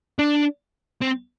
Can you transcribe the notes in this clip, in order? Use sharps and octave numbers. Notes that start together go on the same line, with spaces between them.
D4
C4